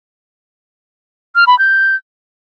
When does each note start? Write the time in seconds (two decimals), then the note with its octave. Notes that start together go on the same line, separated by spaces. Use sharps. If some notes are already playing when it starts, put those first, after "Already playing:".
1.35 F6
1.47 B5
1.59 G6